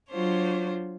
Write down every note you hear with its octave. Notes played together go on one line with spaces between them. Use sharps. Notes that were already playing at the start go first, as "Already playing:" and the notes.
F#3 D4 F4 C5 C#5